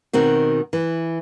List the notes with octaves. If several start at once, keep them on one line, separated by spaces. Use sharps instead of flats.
B2 D#3 C4 F#4
E3